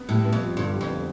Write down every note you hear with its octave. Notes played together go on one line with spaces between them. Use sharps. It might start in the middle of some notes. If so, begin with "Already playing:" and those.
Already playing: B3
A2 G3
B3
F2
F4
G2 D3
G3
F2
B3